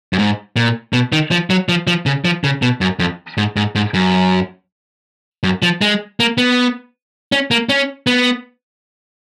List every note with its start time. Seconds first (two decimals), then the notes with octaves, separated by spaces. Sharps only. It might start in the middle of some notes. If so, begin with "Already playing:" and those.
0.13 F#2
0.18 G#2
0.56 A#2
0.93 B2
1.12 D#3
1.31 F3
1.50 F#3
1.69 F3
1.87 F3
2.06 C#3
2.25 F3
2.44 C#3
2.62 B2
2.81 F#2
2.99 F2
3.38 G#2
3.56 G#2
3.75 G#2
3.94 F#2
5.43 F#2
5.62 F3
5.81 G#3
6.20 A#3
6.38 B3
7.32 C#4
7.51 A#3
7.69 C#4
8.07 B3